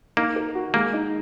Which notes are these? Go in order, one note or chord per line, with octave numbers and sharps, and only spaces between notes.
A#3 D#4
A#4
F#4
G#3 A#3
D#4